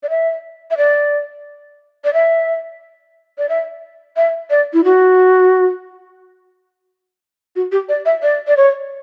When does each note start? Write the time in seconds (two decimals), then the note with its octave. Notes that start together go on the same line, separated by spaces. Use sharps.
0.03 D5
0.10 E5
0.71 E5
0.77 D5
2.04 D5
2.14 E5
3.38 D5
3.49 E5
4.17 E5
4.50 D5
4.73 E4
4.84 F#4
7.56 F#4
7.72 G4
7.89 D5
8.06 E5
8.22 D5
8.48 D5
8.57 C#5